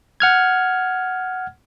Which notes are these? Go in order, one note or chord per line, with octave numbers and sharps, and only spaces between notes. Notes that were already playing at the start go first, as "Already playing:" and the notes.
F#5 F6 G#6